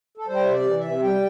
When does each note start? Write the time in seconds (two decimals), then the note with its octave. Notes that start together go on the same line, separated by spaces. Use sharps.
0.17 A4
0.27 G3 C5
0.36 G5
0.44 C3 E5
0.52 D5
0.65 E3
0.78 E5
0.84 C3
1.03 G3 G5